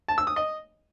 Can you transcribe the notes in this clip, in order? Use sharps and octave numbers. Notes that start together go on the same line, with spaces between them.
A5
E6
D#6
D#5